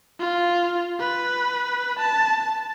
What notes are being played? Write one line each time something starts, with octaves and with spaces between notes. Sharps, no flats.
F4
B4
A5